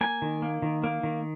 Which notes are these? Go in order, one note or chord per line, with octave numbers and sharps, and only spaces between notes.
A#3 G#5
D#3
A#3
D#3
A#3
D#3